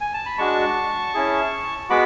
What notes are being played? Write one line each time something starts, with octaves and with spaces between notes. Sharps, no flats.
G#5
A5
B5
G#3 D4 F#4 A5 C#6
C#4 E4 G#4
G#3 B3 F#4 B5 D6